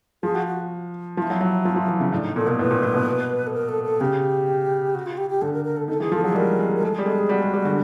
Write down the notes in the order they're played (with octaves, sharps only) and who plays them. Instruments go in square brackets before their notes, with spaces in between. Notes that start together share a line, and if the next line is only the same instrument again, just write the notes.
[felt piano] F3 [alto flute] G#4
[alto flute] F#4
F#4
[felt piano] F3 [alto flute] E4
[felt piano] F#3
F#3
F3
F3
E3
C#3
[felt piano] A2 [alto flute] D4
[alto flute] D#4
[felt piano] A#2 [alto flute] A4
[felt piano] B2 [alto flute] A#4
[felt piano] A2 [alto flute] B4
[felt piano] A#2
A2
B2
[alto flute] A4
A#4
A4
A4
[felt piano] C#3 [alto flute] G4
[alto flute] F#4
F4
G4
G4
[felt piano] D3 [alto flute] A4
[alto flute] A#4
A#4
A4
[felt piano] D#3 [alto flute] A4
[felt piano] E3 [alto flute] G#4
[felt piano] F3 [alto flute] A4
[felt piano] F#3 [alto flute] G#4
[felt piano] G#3
[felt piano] G3 [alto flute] A#4
[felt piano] G#3
[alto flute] A#4
[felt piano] G#3 [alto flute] A4
[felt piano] G3 [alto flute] G#4
[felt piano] G#3 [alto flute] A4
[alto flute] G#4
[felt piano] G3 [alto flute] F#4
[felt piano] G#3
G3
D3